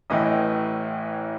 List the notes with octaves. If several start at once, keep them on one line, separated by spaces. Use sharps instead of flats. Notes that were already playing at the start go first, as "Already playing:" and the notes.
A1 A2 E3 D#5